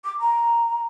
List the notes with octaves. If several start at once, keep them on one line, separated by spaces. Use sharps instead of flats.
D6
A#5